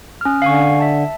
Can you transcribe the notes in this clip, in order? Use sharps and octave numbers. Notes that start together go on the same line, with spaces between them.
C#4 F6
D3 F5 G#5 C#6
E5 A5